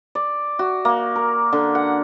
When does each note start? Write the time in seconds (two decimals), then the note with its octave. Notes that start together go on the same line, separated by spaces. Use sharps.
0.15 D5
0.59 F#4
0.85 A#3
1.16 A#4
1.53 D3
1.75 F#5